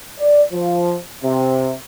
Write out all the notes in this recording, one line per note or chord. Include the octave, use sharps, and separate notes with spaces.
D5
F3
C3